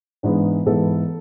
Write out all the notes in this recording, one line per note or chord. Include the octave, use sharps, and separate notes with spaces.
G#2 E3 G#3 B3 D4
G#2 E3 G#3 B3 A4